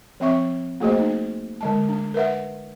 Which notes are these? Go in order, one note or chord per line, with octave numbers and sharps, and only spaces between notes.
F3 C4 E5 C#6
A3 A#3 F#4 G#4 C5 D#5
D#4
D3 G#3 A5
D4
A#4 B4 E5 F#5